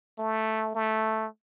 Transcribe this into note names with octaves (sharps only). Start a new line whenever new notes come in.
A3
A3